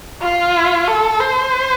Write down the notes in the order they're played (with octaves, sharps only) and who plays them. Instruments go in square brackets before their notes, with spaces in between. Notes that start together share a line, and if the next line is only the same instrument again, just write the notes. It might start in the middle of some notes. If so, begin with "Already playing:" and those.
[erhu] F4
A4
C5